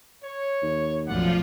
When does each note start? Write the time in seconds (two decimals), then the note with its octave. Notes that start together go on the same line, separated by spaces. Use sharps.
0.24 C#5
0.63 D#2
1.07 B1 F#2 A2 F3 F4 D5 F#5